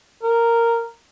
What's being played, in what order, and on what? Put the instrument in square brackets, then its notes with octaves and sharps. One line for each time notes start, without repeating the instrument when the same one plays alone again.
[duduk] A#4